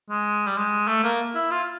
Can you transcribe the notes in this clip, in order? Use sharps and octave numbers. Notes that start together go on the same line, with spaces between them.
G#3
G3
G#3
A3
A#3
E4
F4